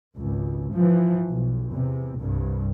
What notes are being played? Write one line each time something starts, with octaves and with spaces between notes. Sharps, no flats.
G#1 C#2
E3 F3
B1
E2 C3
C2 G2